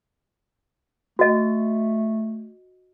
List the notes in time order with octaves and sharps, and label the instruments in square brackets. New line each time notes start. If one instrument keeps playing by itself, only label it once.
[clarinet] A3 [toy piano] F#4 D#5